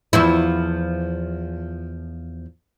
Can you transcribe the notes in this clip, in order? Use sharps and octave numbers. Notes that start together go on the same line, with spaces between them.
E2 F3 E4